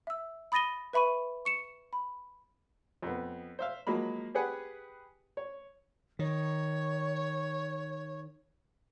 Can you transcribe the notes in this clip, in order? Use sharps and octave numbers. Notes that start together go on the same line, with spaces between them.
E5 E6
B5 D#6 A6 A#6 D#7 G7
B4 E5 B5 C#6 D#7
C#6 C#7 E7
B5
F2 B3
C5 E5 F5
F3 F#3 G#3 A#3 B5
G4 G#4 B4 F#5 G#5
C#5
D#3 C#5